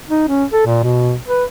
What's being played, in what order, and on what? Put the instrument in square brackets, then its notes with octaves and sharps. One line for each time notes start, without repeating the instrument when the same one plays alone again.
[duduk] D#4
C#4
A4
A#2
B2
B4